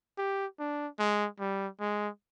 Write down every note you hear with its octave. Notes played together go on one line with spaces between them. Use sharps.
G4
D4
G#3
G3
G#3